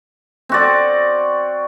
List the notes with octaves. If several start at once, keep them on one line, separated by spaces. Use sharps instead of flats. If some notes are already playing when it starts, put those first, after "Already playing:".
C4 F#4 D5